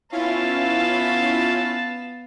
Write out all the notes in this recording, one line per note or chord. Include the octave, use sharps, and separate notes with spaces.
B3 C#4 E4 F4 F5 A5